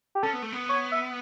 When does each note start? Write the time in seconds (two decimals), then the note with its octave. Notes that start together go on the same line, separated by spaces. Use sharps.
0.15 G4
0.23 C#4 A4
0.33 B3
0.42 A3
0.52 B3
0.69 C#5
0.92 E5